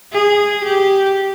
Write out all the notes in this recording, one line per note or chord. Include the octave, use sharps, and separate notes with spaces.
G#4
G4